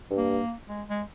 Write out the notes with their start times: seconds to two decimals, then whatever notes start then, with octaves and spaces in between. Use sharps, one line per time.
0.11 G2
0.17 A#3
0.69 G#3
0.89 G#3